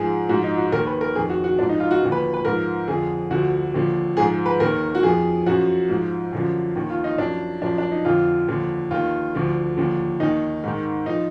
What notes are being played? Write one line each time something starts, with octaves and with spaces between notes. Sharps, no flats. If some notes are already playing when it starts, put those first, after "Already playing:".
Already playing: G#2 F3 G#4
G#2 F3 F#4
D#4
F#4
D#2 D#3 A#4
B4
A#4
F2 D#3 G#4
F#4
F#4
G#2 F3 D4
D#4
F4
F#4
D#2 D3 F3
B4
B4
G#2 F3 A#4
F2 D3 F3 G#4
D2 D3 F3 F#4
D#2 D3 F3
G#2 F3 G#4
B4
D#2 D#3 A#4
F#4
F2 F3 G#4
F#2 F3 F#4
G#2 F3
F#2 D3 F3
D#2 D#3
F4
D#4
F#2 F3 D4
F#2 F3 D4
D4
D#4
F2 D3 F3 F4
D#2 D3 F3
D#2 D#3 F4
D2 D3 F3
D#2 D3 F3
D#2 D#3 D#4
G#2 D#3
F3 D#4